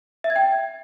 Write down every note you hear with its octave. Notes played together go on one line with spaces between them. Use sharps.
E5
G#6
G5